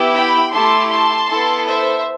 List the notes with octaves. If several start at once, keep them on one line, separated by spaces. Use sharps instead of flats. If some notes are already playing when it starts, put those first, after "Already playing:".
Already playing: B3 E4 G4
G5 B5
A3 E4 G4 A5 C6
A5 C6
B3 E4 A4
C5 E5